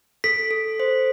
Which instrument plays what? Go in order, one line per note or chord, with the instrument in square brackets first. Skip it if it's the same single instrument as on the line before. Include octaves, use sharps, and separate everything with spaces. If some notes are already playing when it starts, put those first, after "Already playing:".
[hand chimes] A4 [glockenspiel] B6
[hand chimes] A4
C5